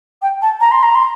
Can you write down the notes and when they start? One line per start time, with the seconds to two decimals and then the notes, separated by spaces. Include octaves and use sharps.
0.21 G5
0.41 A5
0.60 A#5
0.71 C6
0.82 A#5
0.94 C6